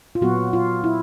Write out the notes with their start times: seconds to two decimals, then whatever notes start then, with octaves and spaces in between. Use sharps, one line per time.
0.15 F4
0.21 A#2 F#3 B3 F#4
0.53 F4
0.84 E4